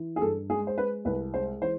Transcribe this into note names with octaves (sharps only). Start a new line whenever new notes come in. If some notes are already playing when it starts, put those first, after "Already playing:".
Already playing: E3
G#4
G2 A4
G#3 G#4
C5
G#3 B4
C2 B4
G#3 C5
E3 C5